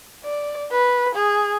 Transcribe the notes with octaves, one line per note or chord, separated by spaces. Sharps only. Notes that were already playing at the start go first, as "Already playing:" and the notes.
D5
B4
G#4